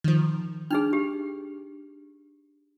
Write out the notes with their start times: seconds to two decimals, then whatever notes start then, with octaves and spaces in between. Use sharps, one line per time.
0.04 D#3 F3
0.71 D4 D#4 G#4 F6
0.93 G4